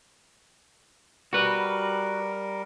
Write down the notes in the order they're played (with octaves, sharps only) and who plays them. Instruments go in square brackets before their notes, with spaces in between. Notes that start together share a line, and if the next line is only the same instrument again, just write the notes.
[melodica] G3 A#4 [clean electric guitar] F#4 B4